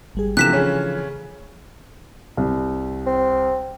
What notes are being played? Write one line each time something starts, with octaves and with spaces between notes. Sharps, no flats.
G#1 G3 G#4
C3 E3 F3 A3 D4 F#6 B6 E7
C#3 C#4
C2
C4